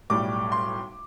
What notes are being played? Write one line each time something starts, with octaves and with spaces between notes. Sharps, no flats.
B1 A2 G3 D6
C6